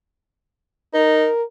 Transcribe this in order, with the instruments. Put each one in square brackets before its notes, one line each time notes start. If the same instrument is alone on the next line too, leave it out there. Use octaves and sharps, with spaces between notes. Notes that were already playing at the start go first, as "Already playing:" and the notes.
[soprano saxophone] D#4 [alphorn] A#4